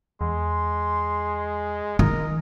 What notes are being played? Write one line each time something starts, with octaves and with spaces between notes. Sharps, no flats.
E2 G#3 C6
D#3 A#4 D#5